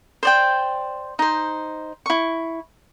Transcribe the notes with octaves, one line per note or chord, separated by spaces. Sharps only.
C5 D5 G5
D#4 C5
E4 C#6